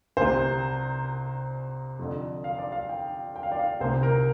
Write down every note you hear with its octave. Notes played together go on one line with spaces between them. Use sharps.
C2 C3 C5
F2 D3
F5
D5
F5
G5
G5
F5
D5
F5
C2 C3 C5
A#4